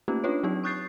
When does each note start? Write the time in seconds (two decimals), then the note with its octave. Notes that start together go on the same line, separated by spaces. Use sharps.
0.08 A3 A#3 C#4 D#4 F4 G4
0.24 C#4 D4 F4 B4 C#5
0.43 F#3 C4 D#4 G4
0.64 C#6 D#6 F#6 G6 A6 C7